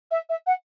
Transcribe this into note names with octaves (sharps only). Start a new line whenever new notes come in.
E5
E5
F#5